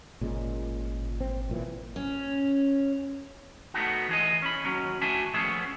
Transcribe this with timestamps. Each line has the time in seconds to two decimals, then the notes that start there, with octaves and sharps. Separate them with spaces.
0.21 G#1 A#2 C#3 G#3
1.20 C4
1.49 B1 A#2 E3
1.96 C#4
3.74 A3 B3 D#4 F#4
4.09 E3 G#4 D#5
4.42 C#4 B5
4.64 D#2 F#3 C#4
5.02 A3 D4 F#4 E5 G#5 A5
5.34 F3 A3 B3 C#4 G#4 E5